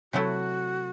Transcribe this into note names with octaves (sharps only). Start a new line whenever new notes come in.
C3 F#3 A3 E4 F#4